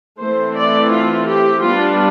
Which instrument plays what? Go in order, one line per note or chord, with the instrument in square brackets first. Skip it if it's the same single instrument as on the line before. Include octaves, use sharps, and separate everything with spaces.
[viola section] E3 A3 C4 C5
D5
F4
G4
G3 B3 D4 F4